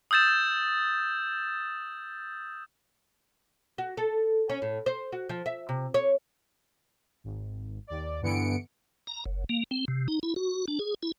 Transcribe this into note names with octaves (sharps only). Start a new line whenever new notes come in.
D#6 E6 G6 A6 E7
F#4
A4
C#4
A2
C5
F#4
F3
E5
C3
C#5
G#1
D#2 D5
G2 D3 E3 B3 C#7 D7
A#5
F#1
A#3
C4
C3
D#4
E4
F#4
D4
G#4
E4